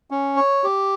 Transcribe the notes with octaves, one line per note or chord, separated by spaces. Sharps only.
C#4
C#5
G4